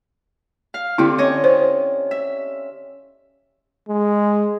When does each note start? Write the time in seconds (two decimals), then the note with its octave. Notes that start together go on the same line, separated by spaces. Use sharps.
0.74 F5
0.98 D3 C4 E4 G4
1.18 C#4 C#5 D#5
1.44 C5
2.11 E5
3.89 G#3